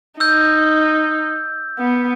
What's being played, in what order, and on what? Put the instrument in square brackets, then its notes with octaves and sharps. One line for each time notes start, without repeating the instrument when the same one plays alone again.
[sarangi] D#4 [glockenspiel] E6 G6
[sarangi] B3